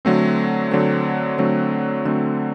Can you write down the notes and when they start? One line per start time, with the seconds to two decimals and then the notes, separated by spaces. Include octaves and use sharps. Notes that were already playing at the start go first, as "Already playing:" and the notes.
0.05 D3 F#3 A3 C4
0.71 D3 F#3 A3 C4
1.38 D3 F#3 A3 C4
2.05 D3 F#3 A3 C4